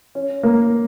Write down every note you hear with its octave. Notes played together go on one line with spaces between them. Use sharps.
C#4
A#3